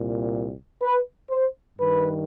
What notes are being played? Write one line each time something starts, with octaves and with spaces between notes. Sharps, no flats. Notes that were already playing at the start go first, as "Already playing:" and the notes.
Already playing: C2 A#2
B4
C5
G2 D#3 B4